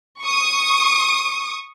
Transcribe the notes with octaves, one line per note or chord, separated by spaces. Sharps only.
C#6 D#6